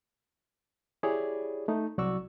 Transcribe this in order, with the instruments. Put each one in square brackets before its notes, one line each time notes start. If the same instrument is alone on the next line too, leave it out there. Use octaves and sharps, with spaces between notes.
[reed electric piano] E4 G4 G#4 C#5 D5
A3 D#4
C2 F#3 F#4 D5 C#6 E6